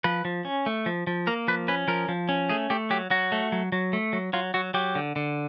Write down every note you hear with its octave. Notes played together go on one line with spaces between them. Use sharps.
F3 B4
F3
C#4
A3
F3
F3
A#3 A#4
F3 B4
C#4 B4
F3 A#4
F3
C#4
A3 G#4
A3 G4
F#3 G4
F#3 F#4
A3
F#3
F#3
A3
F#3
F#3 F4
F#3 F#4
F#3 G4
D3
D3